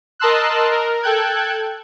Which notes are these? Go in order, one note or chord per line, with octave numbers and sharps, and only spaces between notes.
A#4 D#5 A5 C6 E6 F#6
A#4
A4 G5 F#6 G#6